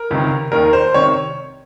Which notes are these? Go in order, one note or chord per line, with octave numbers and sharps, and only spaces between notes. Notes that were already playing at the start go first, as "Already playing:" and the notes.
Already playing: A#4
C#2 C3 D#3
D#2 D#3 A#4
C5
C3 D#3 C#5